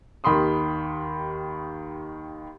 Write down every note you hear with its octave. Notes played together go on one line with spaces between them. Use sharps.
D#2 D#3 G4 B5 C6 D#6